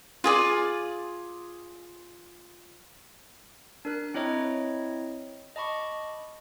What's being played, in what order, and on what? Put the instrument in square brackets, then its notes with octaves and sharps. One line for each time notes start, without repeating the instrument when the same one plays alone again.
[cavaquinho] F4 G#4 D5
[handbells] D4 A#4 F#6
C4 E4 C#5 D#5 A#5
D#5 A5 B5 C#6 D6